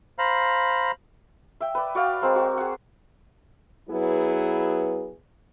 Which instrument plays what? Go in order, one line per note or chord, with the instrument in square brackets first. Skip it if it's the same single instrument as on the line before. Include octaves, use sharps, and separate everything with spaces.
[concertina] C5 F5 A#5 B5
[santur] E5 G5
B4 D5
F#4 D5 F5 G5
G#3 C4 A#4 F5
F#4
G#4 F#5
[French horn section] F#3 B3 E4 G#4 B4